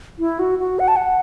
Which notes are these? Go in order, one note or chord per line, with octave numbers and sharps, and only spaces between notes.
E4
F#4
F#4
F#5
A5
F#5